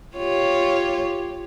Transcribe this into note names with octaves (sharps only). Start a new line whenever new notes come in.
F4 G4 C#5